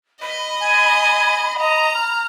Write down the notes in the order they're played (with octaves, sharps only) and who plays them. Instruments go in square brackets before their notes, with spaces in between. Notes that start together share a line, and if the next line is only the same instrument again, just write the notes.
[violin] D#5 [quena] B5
[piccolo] G#5
[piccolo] D#5 [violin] A#5
[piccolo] F6